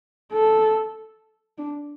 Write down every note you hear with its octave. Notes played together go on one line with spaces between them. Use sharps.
A4
D4